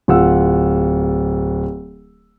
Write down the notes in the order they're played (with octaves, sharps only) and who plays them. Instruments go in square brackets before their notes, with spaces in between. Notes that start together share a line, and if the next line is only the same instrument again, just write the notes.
[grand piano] D1 F4 F#5 E6